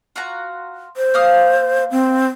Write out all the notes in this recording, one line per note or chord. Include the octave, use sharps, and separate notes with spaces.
F4 F#4 A#5
C5
A#3 F5 D#6
C4